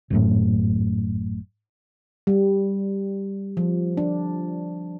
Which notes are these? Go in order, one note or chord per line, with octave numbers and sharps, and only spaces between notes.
G#1 F#2 A2
G3
F3
D4